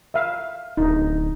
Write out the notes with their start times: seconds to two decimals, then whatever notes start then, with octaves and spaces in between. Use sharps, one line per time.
0.14 E5 F5
0.77 D1 D#4